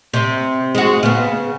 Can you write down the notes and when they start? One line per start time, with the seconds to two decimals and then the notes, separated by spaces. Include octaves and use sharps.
0.13 C3
0.75 G#3 F#4
1.03 C#3 B3